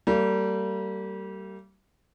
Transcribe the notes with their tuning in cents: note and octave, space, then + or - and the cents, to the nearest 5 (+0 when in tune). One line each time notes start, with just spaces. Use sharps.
G3 -25 A#3 -45